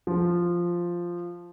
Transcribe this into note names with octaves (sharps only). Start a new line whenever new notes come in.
F3